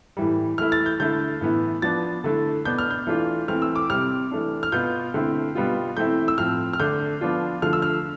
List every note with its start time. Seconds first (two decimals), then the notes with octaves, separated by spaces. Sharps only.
0.17 A2 E3 G3
0.58 E3 A3 E4 F6
0.72 A6
0.86 G6
1.00 D3 A3 E4 G6
1.41 A2 E3 B3 E4
1.82 F3 B3 D4 A6
2.24 D3 A3 E4
2.65 B2 B3 D4 G6
2.79 F6
2.91 G6
3.07 E3 A3 D4 F4
3.48 E3 A3 C4 F6
3.62 E6
3.76 D6
3.90 C3 G3 C4 F6
4.31 E3 A3 D4
4.63 F6
4.72 B2 B3 F4 G6
5.14 D3 A3 C4 E4
5.55 B2 G3 B3 F4
5.97 E3 A3 C4 E4 G6
6.28 E6
6.38 A2 F3 C4 F6
6.73 F6
6.80 D3 A3 D4 G6
7.21 F3 B3 D4 F4
7.62 D3 F3 A3 F6
7.73 E6
7.82 F6